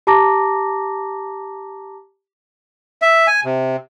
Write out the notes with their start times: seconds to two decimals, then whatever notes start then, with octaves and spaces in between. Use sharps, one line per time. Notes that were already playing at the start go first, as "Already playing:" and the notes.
0.07 G4 A5 A#5 D6 A#6
3.02 E5
3.27 G#5
3.45 C3